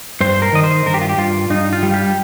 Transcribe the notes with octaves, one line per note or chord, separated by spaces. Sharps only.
G2 C5
A#4
D#3 D#5
C5
G2 A#4
G4
F4
G4
G2 F4
G2 D#4
F4
G3
G4